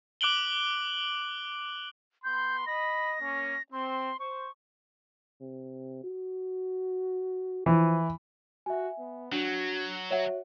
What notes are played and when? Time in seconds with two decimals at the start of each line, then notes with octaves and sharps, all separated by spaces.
0.21 D6 F#6 D7 F#7 G7
2.24 B3 B5 C6 G6
2.66 D#5 B5 A#6
3.21 A#3 C#4
3.72 C4 C6
4.20 C5 C#6
5.41 C3
6.04 F#4
7.66 E3 F3
8.66 F#4 E5 G#5
8.98 B3
9.32 F#3 D4 F#4
10.11 F#4 C#5 E5 F#5